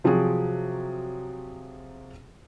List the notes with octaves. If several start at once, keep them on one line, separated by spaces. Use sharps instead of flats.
C3 F3 F#3 C4 F#4 G#4